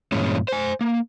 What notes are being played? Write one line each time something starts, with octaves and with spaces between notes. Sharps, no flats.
G2 A#2 E3 G#3 C#4
C5 G#5
A#3